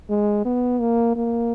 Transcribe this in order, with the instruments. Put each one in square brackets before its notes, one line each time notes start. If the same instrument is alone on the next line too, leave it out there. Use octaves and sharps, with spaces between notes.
[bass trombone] G#3
B3
A#3
A#3